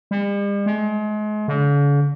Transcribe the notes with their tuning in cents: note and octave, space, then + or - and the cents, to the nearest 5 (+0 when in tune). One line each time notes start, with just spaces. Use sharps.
G3 +45
G#3 +35
D3 -45